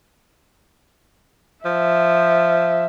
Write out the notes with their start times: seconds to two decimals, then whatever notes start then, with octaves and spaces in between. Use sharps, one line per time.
1.65 F3 E5